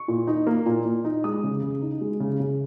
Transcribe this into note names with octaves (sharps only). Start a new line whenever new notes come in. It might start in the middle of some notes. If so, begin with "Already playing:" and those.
Already playing: C#6
A#2
D#4
A#3
A#2
A#2
D#4
G#3 D#6
C#3
C#3
D#4
G#3
C#3
C#3